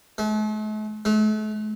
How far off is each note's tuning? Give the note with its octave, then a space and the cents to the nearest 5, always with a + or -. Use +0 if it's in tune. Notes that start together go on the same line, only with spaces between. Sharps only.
A3 -45
A3 -40